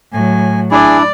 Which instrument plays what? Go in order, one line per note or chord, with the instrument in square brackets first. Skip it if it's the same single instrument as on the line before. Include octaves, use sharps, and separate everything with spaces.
[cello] A2 F#3 [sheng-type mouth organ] G#5
[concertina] D4 E4 [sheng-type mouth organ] G#4 G#5 [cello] D5